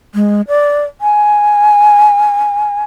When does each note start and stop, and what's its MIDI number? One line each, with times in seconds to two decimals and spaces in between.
0.15 0.42 56
0.48 0.85 74
1.01 2.84 80